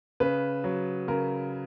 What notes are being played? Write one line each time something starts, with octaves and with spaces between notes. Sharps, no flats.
C#3 B4
F#3
C#3 A#4